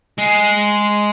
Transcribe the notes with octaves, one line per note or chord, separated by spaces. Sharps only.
G#3